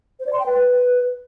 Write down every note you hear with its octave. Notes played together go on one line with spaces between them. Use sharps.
C5
D5
C6
G5
B4